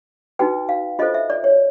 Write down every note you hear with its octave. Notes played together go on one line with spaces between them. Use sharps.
D#4 F#4 B4 G5
F5
F4 A4 C5 D#5
E5
D5
C#5